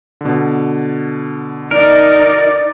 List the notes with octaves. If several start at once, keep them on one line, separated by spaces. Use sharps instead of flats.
B2 D3
D#4 A#4 D5